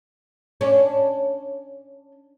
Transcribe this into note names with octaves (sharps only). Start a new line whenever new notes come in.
C#4 D4